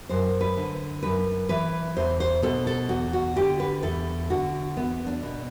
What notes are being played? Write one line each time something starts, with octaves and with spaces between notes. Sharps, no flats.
F#2 C5
B4
D3
F#2 B4
E3 B4
E2 C5
C5
B2 A4
A4
E2 F#4
F#4
D3 G4
B4
E2 A4
D3 F#4
E2 B3
D4
B2